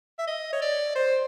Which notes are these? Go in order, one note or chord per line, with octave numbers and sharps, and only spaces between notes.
E5
D#5
C#5
D5
C5